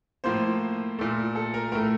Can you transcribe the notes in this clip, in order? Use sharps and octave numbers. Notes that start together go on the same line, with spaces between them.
A2 F3 A#3 C5
A#2 A3
A4
A#4
A2 A3 A#4